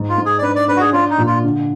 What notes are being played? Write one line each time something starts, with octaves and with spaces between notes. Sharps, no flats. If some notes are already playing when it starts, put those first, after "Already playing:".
Already playing: G#2
F4
G#2
G#4
D5
D4 B4
D5
D4 B4
F#4
G#4
D4 F4
D#4
A#2
F4
D3